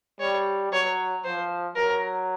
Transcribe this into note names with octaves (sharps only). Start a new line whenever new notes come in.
G3 C#5
F#3 C#5
F3 C5
F#3 A#4